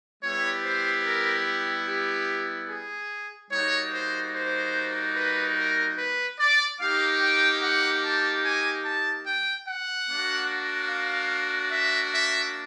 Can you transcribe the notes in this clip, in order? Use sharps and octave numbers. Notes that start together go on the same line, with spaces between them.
G3 B3 E4 G4 C#5
C5
A#4
G4
G#4
G3 A#3 D#4 F#4 C#5
C5
C5
B4
A#4
B4
D5
A#3 D#4 G4 F5
G5
F#5
A5
G#5
A5
G5
F#5
A#3 D4 F#4
F5
E5
E5